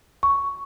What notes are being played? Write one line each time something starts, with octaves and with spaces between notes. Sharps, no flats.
C#6